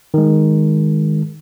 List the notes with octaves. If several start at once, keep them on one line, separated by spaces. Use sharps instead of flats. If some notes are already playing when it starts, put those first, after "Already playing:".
D#3 G#3